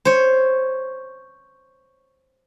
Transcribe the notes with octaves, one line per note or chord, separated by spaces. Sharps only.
C5 C#5